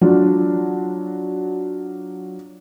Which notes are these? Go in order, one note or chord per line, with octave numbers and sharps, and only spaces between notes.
F#3 D4 F4 F#4